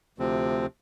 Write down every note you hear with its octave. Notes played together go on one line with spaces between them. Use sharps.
D2 C3 F3 C4